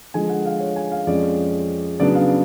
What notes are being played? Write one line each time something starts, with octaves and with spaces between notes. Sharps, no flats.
D3 F3 G#3 G#5
F#5
F5
C#5
G#5
F5
F2 F3 G#3 C#4 D5
C#3 F#3 B3 D4 D5
F5